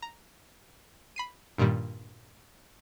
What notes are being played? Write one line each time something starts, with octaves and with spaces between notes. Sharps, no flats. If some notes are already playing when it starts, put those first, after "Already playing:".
A#5
B5 C7 D#7
G2 A#2 D#3 G3